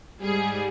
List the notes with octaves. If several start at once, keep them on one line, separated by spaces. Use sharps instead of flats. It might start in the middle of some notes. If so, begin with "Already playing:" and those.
G#2 G3 G#4